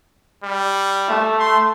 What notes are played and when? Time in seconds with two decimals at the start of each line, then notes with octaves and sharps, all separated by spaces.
0.44 G3
1.08 A3
1.39 C6